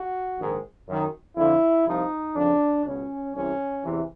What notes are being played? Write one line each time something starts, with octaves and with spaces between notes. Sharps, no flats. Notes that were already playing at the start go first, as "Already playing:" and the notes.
Already playing: F#4
A#1 G#2 D#3
F#2 D#3
F2 D3 F3 E4
C2 C3 F3 D#4
F2 C#3 F3 D4
C#2 B2 C#4
C2 C3 E3 C#4
E2 C3 E3